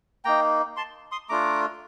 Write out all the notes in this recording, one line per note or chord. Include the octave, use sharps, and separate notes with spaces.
A#3 D#4 G5 A#5
A5 C6
C6 D#6
A3 D4 F4 A#5 D6